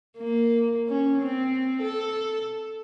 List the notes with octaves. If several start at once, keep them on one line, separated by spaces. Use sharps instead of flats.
A#3
C#4
C4
A4